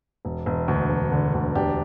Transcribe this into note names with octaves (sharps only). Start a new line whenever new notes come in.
E1
E1
D2
E1
D3
D2
E1 D4 G4